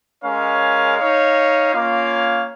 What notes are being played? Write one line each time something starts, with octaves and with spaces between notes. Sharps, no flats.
G#3 C#4 A#4 C#5 F5
D#4 C#5 F5
A#3 C#4 F4 C#5 F5